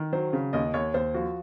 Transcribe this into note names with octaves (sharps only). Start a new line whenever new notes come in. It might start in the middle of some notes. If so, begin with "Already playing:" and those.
Already playing: D#3
F#3 C5
C#3
D#2 D#5
D#2 C#5
D#2 C5
F3 F#4